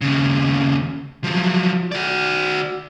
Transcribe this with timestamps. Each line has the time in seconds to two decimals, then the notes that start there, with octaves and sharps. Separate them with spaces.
0.01 D#2 C#3
1.24 F3 F#3
1.92 F#4 D5